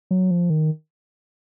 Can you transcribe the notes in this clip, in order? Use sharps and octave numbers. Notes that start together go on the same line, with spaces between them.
F#3
F3
D#3